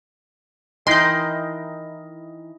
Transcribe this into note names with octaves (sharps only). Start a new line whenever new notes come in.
E3 D#4 E4 A#4 D#5 G5 C6 G6